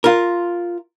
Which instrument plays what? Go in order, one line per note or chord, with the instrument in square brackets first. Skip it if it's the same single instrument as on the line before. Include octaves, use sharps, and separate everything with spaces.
[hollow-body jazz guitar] F4 A#4